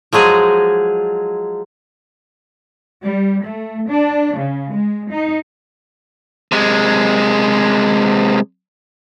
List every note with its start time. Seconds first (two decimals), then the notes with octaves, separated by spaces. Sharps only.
0.13 F3 F#3 G#3 G#4
3.03 G3
3.43 A3
3.87 D4
4.36 C#3
4.71 G#3
5.11 D#4
6.52 C3 G#3